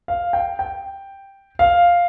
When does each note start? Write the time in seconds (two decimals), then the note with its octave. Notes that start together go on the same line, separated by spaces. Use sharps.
0.08 F5
0.33 G5
0.59 G5
1.59 F5